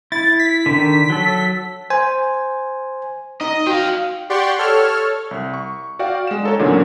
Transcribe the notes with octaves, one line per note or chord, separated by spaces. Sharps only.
E4 A6
B6
D3 D#3
F#3 A4
C5 G#5
D#4 D#5
F#4 F5 G5
G4 D5 F#5 G5 C6 C#6
A4 C#5 F6
C2
C#6
F#4 D5 F5 G5
G#3 E7
D#4 A4 C#5
E2 A#2 D3 F#3 A#3 C#4